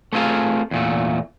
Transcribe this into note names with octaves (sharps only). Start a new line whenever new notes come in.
A3 B3 C4 F4 G#4 A#4
E2 A#2 A3